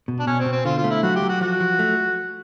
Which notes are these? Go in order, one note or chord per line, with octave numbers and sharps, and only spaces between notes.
B2
D4
B2 C#4
C4
B2
C4
D3 F4
F4
A3
E4
F#3 F#4
G4
F#3
F#4
F3 F#4
F3
A3